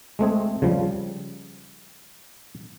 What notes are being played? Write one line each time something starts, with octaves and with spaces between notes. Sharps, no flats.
G#3 A3 C4 G#4
C#3 F3 G3